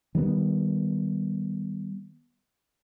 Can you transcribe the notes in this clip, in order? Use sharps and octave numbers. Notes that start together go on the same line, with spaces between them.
D#3 G3 A#3 B3